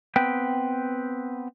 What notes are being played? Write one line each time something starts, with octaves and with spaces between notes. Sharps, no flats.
B3 C4 B4 G5